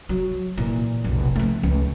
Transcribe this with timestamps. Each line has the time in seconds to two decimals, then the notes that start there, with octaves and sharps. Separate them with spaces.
0.09 F#3
0.57 A#2 E3
1.04 F1 B1
1.36 F3 A3
1.63 C#2